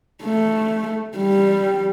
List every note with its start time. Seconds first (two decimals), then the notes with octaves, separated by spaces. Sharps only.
0.23 A3
1.17 G3